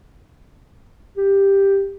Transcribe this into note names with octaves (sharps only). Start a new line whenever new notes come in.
G4